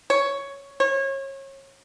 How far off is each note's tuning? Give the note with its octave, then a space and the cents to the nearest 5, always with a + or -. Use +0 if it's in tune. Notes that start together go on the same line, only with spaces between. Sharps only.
C#5 +5
C#5 -30